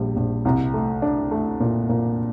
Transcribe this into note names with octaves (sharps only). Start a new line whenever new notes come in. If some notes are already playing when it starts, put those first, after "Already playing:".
Already playing: A#1 G3
A#1
C2
A3
D4
A3
A#2
A#2